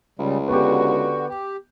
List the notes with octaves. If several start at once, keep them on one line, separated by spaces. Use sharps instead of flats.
C#2 C#3 G3
D3 B3 F#4 G4
G4